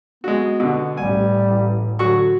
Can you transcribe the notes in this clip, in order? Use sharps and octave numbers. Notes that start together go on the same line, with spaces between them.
G#3 B3 F#4
B2 D3
A1 G3 G#5
D3 F#3 F#4 C#6